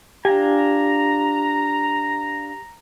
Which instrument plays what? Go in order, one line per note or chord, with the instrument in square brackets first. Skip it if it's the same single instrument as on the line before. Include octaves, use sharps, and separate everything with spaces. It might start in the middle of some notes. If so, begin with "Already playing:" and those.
[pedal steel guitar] D4 F4 G#5 [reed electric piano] G4 [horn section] A#5